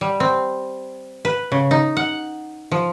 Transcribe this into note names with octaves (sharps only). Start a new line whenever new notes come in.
G3
C4
B4
C#3
D#4
F#5
F3